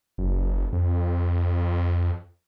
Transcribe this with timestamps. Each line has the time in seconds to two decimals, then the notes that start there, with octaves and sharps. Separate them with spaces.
0.18 F#1
0.73 F2